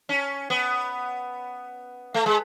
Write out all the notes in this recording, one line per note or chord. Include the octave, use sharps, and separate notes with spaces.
C#4
B3
A3
G#3